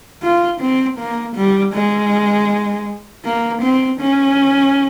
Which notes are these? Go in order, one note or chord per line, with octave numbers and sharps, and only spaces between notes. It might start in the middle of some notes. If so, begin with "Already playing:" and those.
F4
C4
A#3
G3
G#3
A#3
C4
C#4